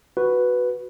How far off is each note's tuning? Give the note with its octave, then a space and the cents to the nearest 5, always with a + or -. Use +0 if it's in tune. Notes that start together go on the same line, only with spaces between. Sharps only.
F#4 +0 B4 +0